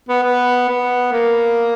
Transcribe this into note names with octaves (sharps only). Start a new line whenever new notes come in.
B3
B3
B3
A#3